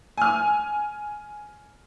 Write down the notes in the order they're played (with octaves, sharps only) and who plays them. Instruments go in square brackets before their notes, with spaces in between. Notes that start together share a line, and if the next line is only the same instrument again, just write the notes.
[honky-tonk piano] G#5 F6